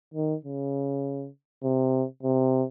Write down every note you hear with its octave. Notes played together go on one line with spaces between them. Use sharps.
D#3
C#3
C3
C3